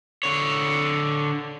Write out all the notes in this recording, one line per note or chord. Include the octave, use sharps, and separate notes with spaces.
D3 C#5